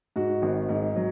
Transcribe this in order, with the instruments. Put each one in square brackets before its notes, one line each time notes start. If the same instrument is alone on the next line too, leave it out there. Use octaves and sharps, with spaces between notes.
[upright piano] G#2 F#4
G#1
G#2
F#3